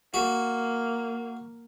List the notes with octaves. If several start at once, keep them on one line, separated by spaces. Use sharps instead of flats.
A#3 F#4